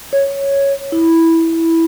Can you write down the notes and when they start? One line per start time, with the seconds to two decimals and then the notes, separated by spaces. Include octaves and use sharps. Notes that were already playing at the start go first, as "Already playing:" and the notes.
0.13 C#5
0.92 E4